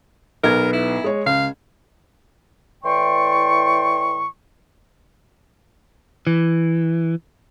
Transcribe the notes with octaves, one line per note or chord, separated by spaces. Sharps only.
B1 B3 A#4 G#6
E4
G#3 C#5
C#2 F5
A2 E3 D5 G5 C6 C#6
E3